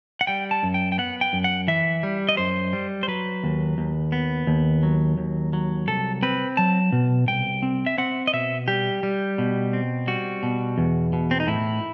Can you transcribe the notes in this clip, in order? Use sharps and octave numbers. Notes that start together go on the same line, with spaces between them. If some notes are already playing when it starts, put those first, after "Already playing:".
F#5
G3 G5
A5
F#2
G5
G5
B3 F#5
G5
F#2
F#5
E3 E5
G3
D#5
F#2 C5
G3
C5
F#3 B4
D#2
D#2
B3
D#2
F#3
D#2
F#3
C2 A4
C4 B4
F#3 A5
B2
C2 G5
C4
E5
C4 F#5
D#5
B2 E5
G3 G4
G3
B2
C4
G3 F#4
B2
E2
B2
C4
D#4
A2 E4